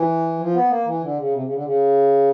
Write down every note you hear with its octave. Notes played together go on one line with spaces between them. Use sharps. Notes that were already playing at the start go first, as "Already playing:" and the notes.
Already playing: E3
F3
B3
A#3
E3
D3
C#3
C3
C#3
D3
C#3